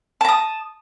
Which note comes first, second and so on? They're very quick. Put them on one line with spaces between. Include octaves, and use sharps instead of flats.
A5 A#5 D#6